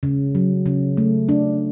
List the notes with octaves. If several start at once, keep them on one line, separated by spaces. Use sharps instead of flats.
C#3
F#3
C#3
A3
D4